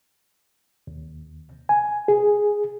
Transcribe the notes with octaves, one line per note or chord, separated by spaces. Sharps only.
D#2
G#5
G#4